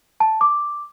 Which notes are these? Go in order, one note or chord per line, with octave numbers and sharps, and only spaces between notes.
A5
D6